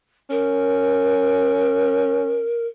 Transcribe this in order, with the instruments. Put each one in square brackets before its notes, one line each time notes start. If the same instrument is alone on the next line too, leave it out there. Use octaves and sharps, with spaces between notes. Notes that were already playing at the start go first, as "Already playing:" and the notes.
[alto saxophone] C#4 [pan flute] A#4